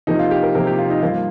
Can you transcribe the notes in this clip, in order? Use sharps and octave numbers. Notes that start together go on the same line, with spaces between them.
C3 F3 A#3 D#4
F4
G4
A#4
C3 F3 A#3 A#4
G4
F4
D#4
G2 F3 A#3 F4